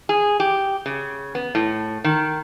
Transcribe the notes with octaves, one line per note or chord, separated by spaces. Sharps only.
G#4
G4
C#3
B3
A2
D#3